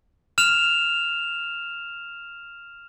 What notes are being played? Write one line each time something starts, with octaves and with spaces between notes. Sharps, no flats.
F6 E7 F7